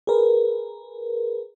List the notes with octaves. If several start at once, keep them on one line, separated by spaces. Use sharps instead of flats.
G#4 A#4 B4